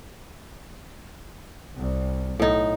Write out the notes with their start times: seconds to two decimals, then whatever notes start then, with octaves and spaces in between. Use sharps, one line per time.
1.77 C2
2.40 B1 A2 D#4